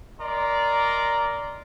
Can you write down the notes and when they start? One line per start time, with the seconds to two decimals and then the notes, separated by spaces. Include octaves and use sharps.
0.20 A#4 D5 D#5 A#5 C6